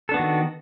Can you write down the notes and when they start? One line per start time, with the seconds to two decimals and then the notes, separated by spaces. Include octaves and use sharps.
0.09 A4
0.12 D4
0.14 B3
0.17 F#4
0.19 D#3